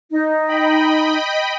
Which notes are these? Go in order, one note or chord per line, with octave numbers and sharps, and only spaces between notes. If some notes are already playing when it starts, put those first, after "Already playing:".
D#4
D#5 G5 B5